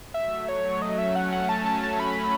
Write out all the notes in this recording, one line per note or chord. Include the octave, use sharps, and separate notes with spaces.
F#3 A3 E5
F#3 A3 C#5
A3 C#4 D#5
E5
F#5
F#5
A5
A5
A5
B5